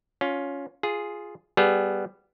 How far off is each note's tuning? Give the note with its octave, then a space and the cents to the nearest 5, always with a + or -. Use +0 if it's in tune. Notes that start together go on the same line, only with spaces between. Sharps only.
C#4 +10 F4 +20
F4 +0 G#4 +0
G3 +0 B3 +0 G#4 +15